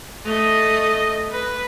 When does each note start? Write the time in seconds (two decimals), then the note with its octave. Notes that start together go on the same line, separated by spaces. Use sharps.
0.25 A3 D#5
1.32 B4